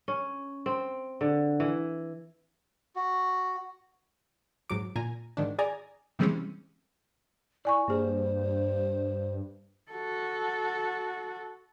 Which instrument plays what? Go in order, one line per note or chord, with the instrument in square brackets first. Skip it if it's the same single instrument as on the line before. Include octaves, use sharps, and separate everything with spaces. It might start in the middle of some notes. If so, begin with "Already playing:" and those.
[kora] C#4
C4
D3
E3
[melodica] F#4
[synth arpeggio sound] G#2 F#3 D6
A#2 G#5 A#5
G#2 D#3 D4
G#4 D5 G#5 A#5
C3 E3 G3 G#3 C4 C#4
[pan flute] E4 [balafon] D5 G#5 C#6
[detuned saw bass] G2 [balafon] A#3 G#4 [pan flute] C5
[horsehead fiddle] F#4 A4